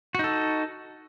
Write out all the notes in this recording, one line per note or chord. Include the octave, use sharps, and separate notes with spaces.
D#4 F#4 A4